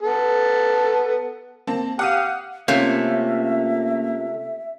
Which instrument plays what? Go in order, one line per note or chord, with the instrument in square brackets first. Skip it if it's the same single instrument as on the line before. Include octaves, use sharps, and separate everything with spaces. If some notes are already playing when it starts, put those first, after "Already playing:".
[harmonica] B3 A4
[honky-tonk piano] A#3 C4 A5
[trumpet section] G4 F5 [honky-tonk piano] F#5 D#6 D#7
[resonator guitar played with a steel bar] C3 A3 [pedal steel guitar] A#3 [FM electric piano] C#4 F4 [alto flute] E5